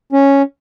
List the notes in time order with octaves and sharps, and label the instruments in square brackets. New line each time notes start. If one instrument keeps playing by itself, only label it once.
[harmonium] C#4